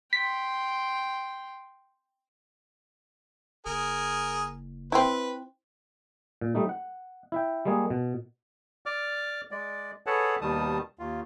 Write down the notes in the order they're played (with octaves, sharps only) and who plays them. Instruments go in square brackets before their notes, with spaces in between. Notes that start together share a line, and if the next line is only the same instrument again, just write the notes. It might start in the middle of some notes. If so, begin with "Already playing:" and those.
[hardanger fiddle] G5 C6 [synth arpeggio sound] B6
[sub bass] F#1 [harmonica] G#4 A#4
[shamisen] C4 E4 [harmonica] B4
[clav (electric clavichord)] A#2
G3 A3 D#4
F#5
E4 E5 G5
G3 G#3 A#3 G#4
B2
[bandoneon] D5 D6 F6
G#3 D5
G#4 A4 B4 C#5 F#5 A5
D#2 B2 D#3 G3 A5 D#6
D#2 F4